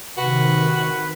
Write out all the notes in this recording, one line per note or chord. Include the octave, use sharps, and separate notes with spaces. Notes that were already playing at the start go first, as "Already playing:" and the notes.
C3 D#3 F#4 B4